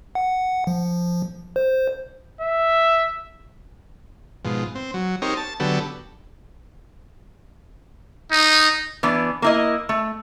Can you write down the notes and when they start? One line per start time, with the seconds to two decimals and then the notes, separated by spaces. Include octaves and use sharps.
0.15 F#5
0.67 F3
1.56 C5
2.41 E5
4.45 G#2 B2 F3
4.75 C4
4.94 F#3
5.22 C4 D#4 G4 A#4 C#5
5.37 A5
5.60 D3 F#3 B3 G4 A4
8.31 D#4
9.03 E3 B3 D4
9.42 A#3 E4 D#5
9.89 A3